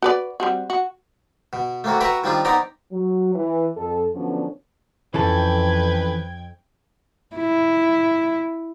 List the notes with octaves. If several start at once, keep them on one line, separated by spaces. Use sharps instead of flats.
F#4 B4 D5
G3 C4 F#4
F#4
B2
A3 A#3 C4 F#4
F#4 B4 E5 G5 A#5 C#6
D#3 F3 G3 C4 D4 F4
B3 C4 D#4 D5 G5 A#5
F#3
E3
F2 A4
D3 F3 F#3 B3 C#4 D4
F2 E3 C#4 A4 B4 G5 G#6
E4